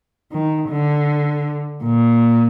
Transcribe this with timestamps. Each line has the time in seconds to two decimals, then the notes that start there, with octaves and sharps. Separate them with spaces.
0.32 D#3
0.69 D3
1.84 A#2